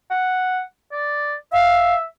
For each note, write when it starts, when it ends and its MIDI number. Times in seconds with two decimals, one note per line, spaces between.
0.10 0.61 78
0.92 1.34 74
1.53 2.04 76
1.53 1.95 77